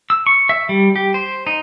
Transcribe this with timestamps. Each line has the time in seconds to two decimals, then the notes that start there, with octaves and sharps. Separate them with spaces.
0.10 E6
0.27 C#6
0.49 E5
0.69 G3
0.96 G4
1.14 C5
1.47 D#4